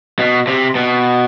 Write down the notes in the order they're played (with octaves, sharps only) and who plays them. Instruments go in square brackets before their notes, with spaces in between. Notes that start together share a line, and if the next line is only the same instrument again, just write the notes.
[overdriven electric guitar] B2
C3
B2